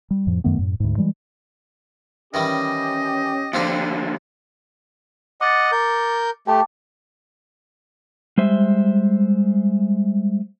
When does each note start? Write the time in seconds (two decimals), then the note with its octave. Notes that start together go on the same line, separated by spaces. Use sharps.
0.11 G3
0.27 F2 A2 F3
0.44 F#2 D#3 A3 B3
0.59 F#2 A2
0.80 D2 G#2
0.97 E3 G3 G#3
2.34 D#3 E3 G3 C#4 G4 D#5
3.53 D#2 D3 F3 C4 D4
5.41 D#5 F#5 D6 A6 C#7
5.72 A#4 G6
6.47 A3 G4 G5 A5 D6
8.38 G3 G#3 C5 E5